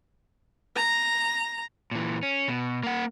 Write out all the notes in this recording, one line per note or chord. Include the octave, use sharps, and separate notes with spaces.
A#5
A#2 E3
C#4
B2
A#3 F#5